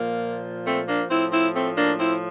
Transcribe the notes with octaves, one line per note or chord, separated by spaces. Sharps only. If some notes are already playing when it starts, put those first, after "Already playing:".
Already playing: A#2 F3 A#3
A3 C4
A#3 D4
A2 F3 C4 E4
C4 E4
A3 C4
A#3 D4
C4 E4